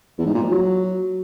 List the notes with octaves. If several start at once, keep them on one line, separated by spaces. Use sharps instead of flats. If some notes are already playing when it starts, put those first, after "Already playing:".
E2
G#2
A#2
F3
F#3